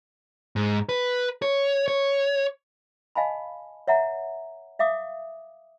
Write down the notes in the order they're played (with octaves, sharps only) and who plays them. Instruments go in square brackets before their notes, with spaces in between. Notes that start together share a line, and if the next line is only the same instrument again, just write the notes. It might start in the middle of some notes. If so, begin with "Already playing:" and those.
[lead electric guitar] G#2
B4
C#5
C#5
[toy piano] D#5 F5 G#5 A5 B5
C#5 E5 F#5 A#5
E5 F5 D6 D#6